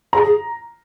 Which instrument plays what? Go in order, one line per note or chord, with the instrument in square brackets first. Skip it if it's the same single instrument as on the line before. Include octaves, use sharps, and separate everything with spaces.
[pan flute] G#4 [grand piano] A#5
[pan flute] G#4